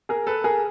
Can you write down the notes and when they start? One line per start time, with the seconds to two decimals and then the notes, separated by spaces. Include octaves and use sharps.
0.09 G#4 A#4
0.27 A4 B4
0.44 G#4 A#4